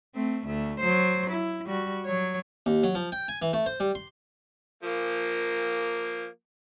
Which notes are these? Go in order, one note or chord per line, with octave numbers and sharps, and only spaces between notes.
A3 C4
D2 A3
F#3 C5
E4
G3 F#4
F#3 C#5
D#2
F#3
F3
G5
G#5
E3
A3
C5
G3
C6
F3 A#3